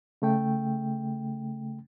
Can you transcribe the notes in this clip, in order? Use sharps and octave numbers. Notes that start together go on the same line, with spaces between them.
C#3 A3 G5